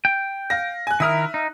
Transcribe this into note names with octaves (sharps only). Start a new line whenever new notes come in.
G5
F5 A#6
G#5 F#6
D#3 E4 A#4 E5 D#6 F6
D#4